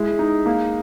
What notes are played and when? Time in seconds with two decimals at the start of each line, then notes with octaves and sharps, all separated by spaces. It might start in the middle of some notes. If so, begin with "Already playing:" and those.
Already playing: G#3 E4
0.19 D#4
0.46 A#3